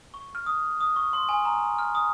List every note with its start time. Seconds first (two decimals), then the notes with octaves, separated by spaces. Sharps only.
0.14 C#6
0.35 F6
0.46 D#6
0.81 D#6
0.96 C#6
1.13 C6
1.29 G#5
1.45 A#5
1.79 F6
1.95 D#6